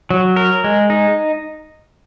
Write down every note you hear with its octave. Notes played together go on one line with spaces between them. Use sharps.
F#3
A#4
G#3
D#4